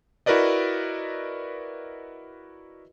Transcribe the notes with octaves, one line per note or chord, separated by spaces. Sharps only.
E4 F#4 A#4 B4 D5 D#5